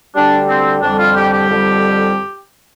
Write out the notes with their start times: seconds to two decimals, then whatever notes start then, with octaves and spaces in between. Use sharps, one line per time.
0.15 D2 D3 G3 D4
0.48 C4
0.82 F2 D3 G3 D4
0.99 F4
1.16 G4
1.32 G4
1.49 F2 D3 G3